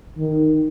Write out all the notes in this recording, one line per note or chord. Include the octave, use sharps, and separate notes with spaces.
D#3